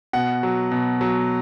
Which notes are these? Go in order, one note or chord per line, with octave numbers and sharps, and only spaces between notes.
B2 F#5
F#3
B2
F#3